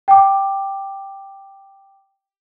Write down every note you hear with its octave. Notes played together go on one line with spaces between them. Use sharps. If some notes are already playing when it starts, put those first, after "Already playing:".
G5 D6